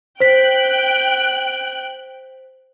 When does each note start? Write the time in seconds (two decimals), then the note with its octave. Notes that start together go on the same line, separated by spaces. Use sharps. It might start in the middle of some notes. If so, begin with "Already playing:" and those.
0.20 C5 G5 F#6 B6